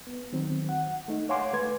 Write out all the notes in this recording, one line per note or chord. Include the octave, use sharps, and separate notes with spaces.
B3
D#3 F#3 C4
F#5
A3 D#4
C#5 F5 F#5 G#5 C6 D6
A3 B4 G#6